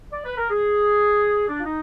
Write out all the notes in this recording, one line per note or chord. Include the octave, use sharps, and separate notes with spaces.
D5
B4
A#4
G#4
D4
F4
D#4